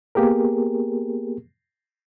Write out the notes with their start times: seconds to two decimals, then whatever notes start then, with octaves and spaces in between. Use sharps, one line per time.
0.15 A#3 B3 G4 G#4 A#4